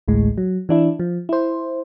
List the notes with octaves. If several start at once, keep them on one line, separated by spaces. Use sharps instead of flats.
A1 D2 A2 G#3
F#3
E3 D4 E4
F3
E4 C5